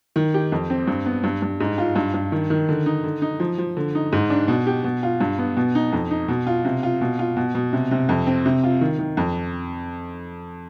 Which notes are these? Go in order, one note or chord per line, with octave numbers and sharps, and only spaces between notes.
D#3
G4
F2
C4
G2
B3
G2
G2
G#2
F4
G2
G2
D#3
D#3
D3
D#4
D3
D#4
F3
F3
D3
D#4
G#2
D4
B2
G4
B2
F4
G2
B3
B2
D#4
F2
D#4
B2
F4
C3
F4
B2
F4
B2
B2
C3
C3
F2
C4
C3
F4
D#3
D#3
F2